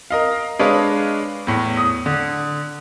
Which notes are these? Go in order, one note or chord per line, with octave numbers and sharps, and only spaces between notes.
A#4 D#5 F5
G#3 D4 B4 C#5 D#5 F5
E2 A2
D#6
D3